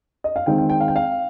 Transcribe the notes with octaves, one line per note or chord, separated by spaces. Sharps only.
D#5
F5
D#3 G#3 C4 D#4 G5
G5
G5
F5
G5
F5